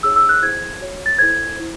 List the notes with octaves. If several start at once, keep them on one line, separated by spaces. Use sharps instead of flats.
D#4 G#4 C#5 E6
E6
F#6
E4 G#4 C5 G#6
F#4 C#5
A6
E4 A4 C5 G#6
E4 C5